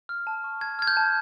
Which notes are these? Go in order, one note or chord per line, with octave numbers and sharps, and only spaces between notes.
F6
A5
C#6
A5 G#6
F6 G#6
G6
A5